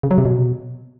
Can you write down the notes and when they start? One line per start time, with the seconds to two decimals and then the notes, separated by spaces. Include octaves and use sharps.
0.03 C#3
0.11 F#3
0.18 C3
0.25 B2